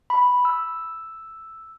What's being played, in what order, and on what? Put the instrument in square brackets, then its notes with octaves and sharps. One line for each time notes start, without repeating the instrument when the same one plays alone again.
[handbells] B5
E6